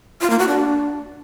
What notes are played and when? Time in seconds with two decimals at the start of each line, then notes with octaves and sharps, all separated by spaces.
0.21 F4
0.30 A#3
0.39 F#4
0.48 D4